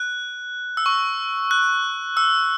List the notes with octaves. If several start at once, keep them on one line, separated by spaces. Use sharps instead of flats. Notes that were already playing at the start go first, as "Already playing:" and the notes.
Already playing: F#6
E6
C#6
F#6
E6